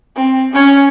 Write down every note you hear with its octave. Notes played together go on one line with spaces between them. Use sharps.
C4
C#4 C#5